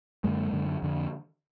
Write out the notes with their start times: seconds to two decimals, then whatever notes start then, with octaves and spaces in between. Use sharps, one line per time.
0.24 F#2 D3 G#3 A#3
0.53 F#2 D3
0.82 F2 D3